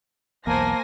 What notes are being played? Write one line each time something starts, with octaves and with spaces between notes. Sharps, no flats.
B1 E2 A#3 C5 G#5 A5 A#6